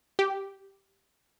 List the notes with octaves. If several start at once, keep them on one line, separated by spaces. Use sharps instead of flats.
G4